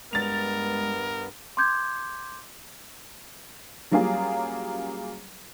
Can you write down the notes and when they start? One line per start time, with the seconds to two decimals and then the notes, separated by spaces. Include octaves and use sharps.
0.13 G2 G#3 B3 A#4 A6 F7
1.57 C6 D6 G6 G#6
3.91 F#3 G3 A#3 C#4 F4 G#4